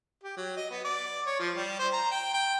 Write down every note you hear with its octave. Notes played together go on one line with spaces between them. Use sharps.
G4
F#3
D#5
B3
D5
C#5
F3
G3
C5
A#5
G5
G5